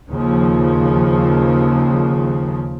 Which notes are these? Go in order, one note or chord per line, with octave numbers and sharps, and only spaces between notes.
D#2 C#3 F3